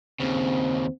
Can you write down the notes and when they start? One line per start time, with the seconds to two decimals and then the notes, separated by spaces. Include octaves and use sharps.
0.20 D#2 C#3 C4